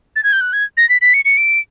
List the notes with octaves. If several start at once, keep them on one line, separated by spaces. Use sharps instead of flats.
A6
G#6
G6
F#6
G#6
A#6
B6
B6
C#7
C#7
D7